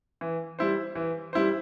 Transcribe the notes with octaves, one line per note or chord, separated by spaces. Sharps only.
E3
G3 E4 C5
E3
G3 E4 C5